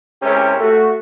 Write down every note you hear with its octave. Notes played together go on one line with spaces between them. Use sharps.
C3 G#3 C#4 E4 G4 A#4
A3 F#4